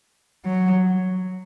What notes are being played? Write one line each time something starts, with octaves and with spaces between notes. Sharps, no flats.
F#3